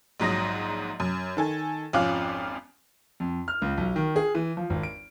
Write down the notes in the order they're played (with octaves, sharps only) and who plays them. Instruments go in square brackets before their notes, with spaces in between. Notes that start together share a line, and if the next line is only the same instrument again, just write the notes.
[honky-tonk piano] A#1 G#2 F#3 D#6 A#6
F#2
D#3 A4 G#5
G#1 F2 C#4 F4 D6 F#6
[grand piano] F2
F6
C#2
B1
D#3
G#4
E3
F3
G#1
D7